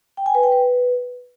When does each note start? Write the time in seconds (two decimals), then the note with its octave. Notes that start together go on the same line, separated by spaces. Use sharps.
0.17 G5
0.26 G#5
0.35 B4
0.43 G5
0.52 B4